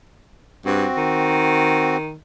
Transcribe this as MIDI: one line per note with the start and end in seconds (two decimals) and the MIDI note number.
0.65 0.86 43
0.65 1.97 60
0.65 1.97 66
0.97 2.16 51